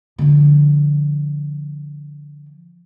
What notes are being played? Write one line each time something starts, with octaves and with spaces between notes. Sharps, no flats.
D3 F3